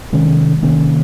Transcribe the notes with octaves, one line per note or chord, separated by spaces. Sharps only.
C3 D#3 G#3 C#4
C3 D#3 A#3 C#4